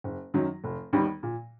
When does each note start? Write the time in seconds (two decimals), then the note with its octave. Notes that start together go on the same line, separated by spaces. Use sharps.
0.04 F#1
0.34 F#2 D#3 F#3
0.64 F1
0.93 D#2 D#3 G3 B3
1.23 A#2